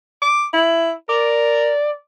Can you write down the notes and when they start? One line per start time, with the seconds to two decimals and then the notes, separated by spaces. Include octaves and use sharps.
0.22 D6
0.54 E4
1.09 A#4 D5